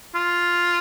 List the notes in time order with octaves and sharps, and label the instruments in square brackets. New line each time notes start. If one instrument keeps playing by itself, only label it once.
[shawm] F4